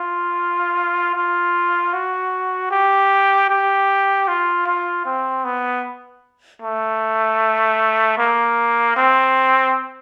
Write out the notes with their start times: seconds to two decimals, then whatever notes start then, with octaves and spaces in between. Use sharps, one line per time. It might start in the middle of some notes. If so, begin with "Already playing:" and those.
Already playing: F4
1.15 F4
1.93 F#4
2.71 G4
3.50 G4
4.28 F4
4.66 F4
5.06 C4
5.44 B3
6.62 A3
8.18 A#3
8.97 C4